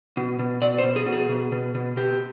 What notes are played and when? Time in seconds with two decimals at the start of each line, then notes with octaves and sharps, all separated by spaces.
0.17 B2
0.39 B2
0.62 B2 D5
0.78 C5
0.84 B2
0.96 G#4
1.06 B2
1.13 G#4
1.29 B2
1.52 B2
1.75 B2
1.97 B2 G4